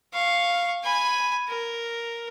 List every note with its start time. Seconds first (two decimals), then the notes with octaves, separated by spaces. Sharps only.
0.14 F5 C#6
0.83 G#5 B5
1.48 A#4